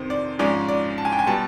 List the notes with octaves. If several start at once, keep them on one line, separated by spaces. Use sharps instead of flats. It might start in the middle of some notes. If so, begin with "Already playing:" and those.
Already playing: F2 C3 D#3 C5
D5
G#2 F3 G#3 C#4 D5
D5
A5
G#5
G5
G#5
B2 G3 A5